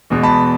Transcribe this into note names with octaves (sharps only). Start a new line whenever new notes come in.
E2 B2 G#3
A5 B5